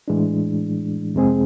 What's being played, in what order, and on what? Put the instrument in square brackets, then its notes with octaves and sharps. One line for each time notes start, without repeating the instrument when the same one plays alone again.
[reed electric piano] A2 E3 G#3 D4
F2 C3 G#3 C4 G#4